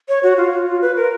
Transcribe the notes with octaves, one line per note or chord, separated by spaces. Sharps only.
C#5
F#4
F4
F4
F4
B4
A#4